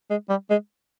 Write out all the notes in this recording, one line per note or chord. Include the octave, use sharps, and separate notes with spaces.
G#3
G3
G#3